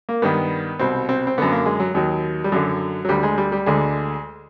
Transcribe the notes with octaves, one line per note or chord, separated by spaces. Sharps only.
A#3
G2 D#3 B3
C2 B2 C4
C4
C4
F#2 D3 B3
A#3
G#3
F#3
D#2 D#3 F#3
G3
F#2 D3 F#3
F#3
D2 D3 G3
G#3
G3
G3
D2 D3 G#3